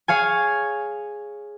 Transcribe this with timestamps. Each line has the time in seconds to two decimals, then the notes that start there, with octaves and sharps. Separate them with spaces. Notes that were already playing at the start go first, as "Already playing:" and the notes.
0.08 G#4 C#5 F5 G#5